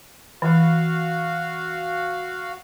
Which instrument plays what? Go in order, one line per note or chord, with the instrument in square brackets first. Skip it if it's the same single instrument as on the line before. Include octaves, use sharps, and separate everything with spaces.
[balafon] E3 [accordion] F#4 F5